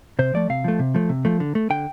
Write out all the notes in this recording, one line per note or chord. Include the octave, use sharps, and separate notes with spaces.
C3 C5
F3 A3 D5
C3 F5
F3 A3
C3
F3 A3
C3
F3 A3
D3
A3
D3 G5